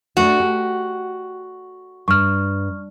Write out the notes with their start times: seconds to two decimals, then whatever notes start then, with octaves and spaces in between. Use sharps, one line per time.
0.17 A3 B3 D4 F#4
0.40 G4
2.08 G2 C#6 F6